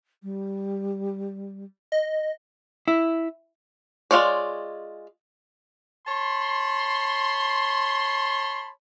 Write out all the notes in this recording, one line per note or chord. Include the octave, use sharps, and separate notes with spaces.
G3
D#5
E4
G#3 D4 F4 C#5 D5
C#5 A5 B5 C6